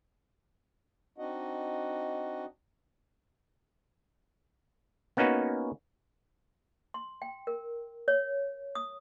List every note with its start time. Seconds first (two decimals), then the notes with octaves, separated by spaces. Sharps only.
1.18 C4 D4 D#4 F#4 D#5 F#5
5.17 A#3 B3 C#4 D#4 F#4 B4
6.94 C6
7.22 G5
7.47 A#4
8.08 C#5
8.75 D#6